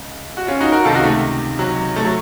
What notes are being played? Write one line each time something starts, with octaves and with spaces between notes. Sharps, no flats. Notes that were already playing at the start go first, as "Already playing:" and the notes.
Already playing: C#2
F#4
C#4 F4
D#4 F#4
F#4 A#4
C#2 C3 D#3 F4 A4
D#4 F#4
A3
F#3
A3
F#3